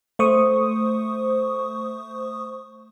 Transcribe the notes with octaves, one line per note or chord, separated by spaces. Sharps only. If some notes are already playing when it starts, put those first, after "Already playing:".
A3 C5 C#6 D#6